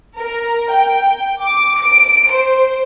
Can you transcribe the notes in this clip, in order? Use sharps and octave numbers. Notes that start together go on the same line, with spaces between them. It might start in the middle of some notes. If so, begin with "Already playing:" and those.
A#4
G5
D6
D7
C5